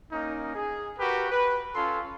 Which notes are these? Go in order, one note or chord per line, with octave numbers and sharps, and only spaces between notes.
A#3 C#4 D#4
G#4
F#4 G4 A#4 B4
B4
C#4 F4 A4 C6